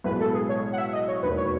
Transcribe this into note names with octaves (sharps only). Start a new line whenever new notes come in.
B1 A2 G#3 B3 B4
A4
G#4
C#5
F#5
E5
D#5
C#5
E1 D#2 D#3 F#3 B4
C#5